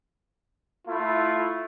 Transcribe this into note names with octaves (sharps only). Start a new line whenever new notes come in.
A3 E4 F4